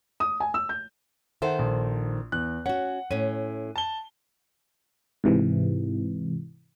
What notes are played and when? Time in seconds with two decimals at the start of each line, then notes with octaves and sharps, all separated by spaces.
0.20 D#6
0.40 G#5
0.54 E6
0.69 G6
1.42 D#3 A4 C5 E5 F#5
1.59 A#1
2.32 E2 F#6
2.66 C#4 F#4 F#5
3.11 A2 C#4 D#7
3.76 A5 G7
5.24 G#2 C3 E3